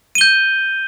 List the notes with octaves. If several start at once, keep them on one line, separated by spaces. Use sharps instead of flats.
G6 D#7 G7